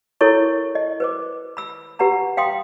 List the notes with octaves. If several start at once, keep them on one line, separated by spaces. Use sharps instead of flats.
E4 A4 A#4 C#5 C#6
D#5
B4 C5 D6
B5 E6
G4 B4 F#5 A#5 B5
F5 G5 C6 D#6